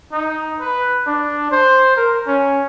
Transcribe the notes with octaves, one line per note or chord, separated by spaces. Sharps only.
D#4
B4
D4
C5
A#4
C#4